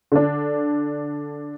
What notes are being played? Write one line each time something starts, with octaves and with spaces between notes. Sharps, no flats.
D3 D4